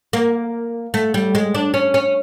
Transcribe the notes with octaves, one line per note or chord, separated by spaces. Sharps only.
A#3
A3
G3
G#3
D4
C#4
C#4